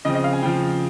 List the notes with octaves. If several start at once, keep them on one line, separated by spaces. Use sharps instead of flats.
C#3 F3 C4 D#5
D#5
F5
G#5
C#3 F3 C4 G5